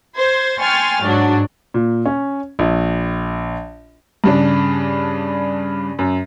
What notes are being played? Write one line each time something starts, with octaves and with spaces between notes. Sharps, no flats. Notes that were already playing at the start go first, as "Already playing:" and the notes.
C5 G#6
G5 G#5 C6 C#6 F6 A6
G#2 F#3 D4 F#4
A#2
C#4
A#1
G2 C#3 D4
F#2